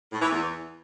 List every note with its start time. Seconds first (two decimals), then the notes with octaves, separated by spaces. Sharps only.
0.12 A2
0.21 E3
0.31 E2